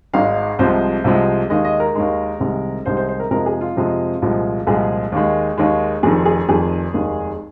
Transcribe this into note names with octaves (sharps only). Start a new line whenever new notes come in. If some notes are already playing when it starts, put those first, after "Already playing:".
G#1 G#2 G#3 F5
C2 C3 F3 G#3 C5
C2 C3 F3 G#3
D#2 D#3 G#3 D#5
D#5
A#4
D#2 D#3 G#3
C2 C3 D#3 G#3
C2 C3 D#3 G#3 C5
C5
C5
A#4
F2 C3 F3 G#3 A#4
G#4
F4
F2 C3 F3 G#3
C2 A#2 F3 G#3
C2 A#2 F3 G#3 G#4
D#2 D#3 G#3
D#2 D#3 G#3
F1 F2 D#3 G#4
G#4
F1 F2 D#3 G#4
F1 D#2 D#3 G#3